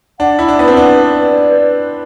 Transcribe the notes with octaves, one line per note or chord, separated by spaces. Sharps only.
D4 F#5
E4
D4
B3 B4
C4
D4
D5
B4